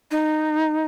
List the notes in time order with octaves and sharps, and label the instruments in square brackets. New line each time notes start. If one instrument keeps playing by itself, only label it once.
[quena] D#4